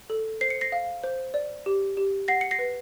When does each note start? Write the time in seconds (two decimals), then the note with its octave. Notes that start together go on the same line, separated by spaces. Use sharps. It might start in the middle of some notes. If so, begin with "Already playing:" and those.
0.10 A4
0.41 C5 C7
0.50 C#7
0.61 A#6 C7
0.72 F5
1.04 C5
1.34 D5
1.66 G4
1.97 G4
2.28 F#5 A#6 C7
2.41 C#7
2.51 A#6 C7
2.59 B4